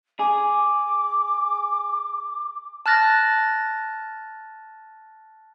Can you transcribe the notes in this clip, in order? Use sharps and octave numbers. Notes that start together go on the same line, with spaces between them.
G#4 D6
A5 F6 F#6 A6 A#6